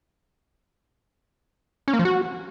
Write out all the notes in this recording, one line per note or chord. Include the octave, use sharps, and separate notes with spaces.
C#4
A#3
F3
F#4